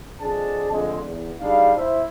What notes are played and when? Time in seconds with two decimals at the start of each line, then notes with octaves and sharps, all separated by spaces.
0.21 F2 G#3 D4 G#4 A5
0.71 F2 D3 G#3
1.04 E2
1.40 G3 G#3 D4 D#4 F5
1.76 E4 C5 E5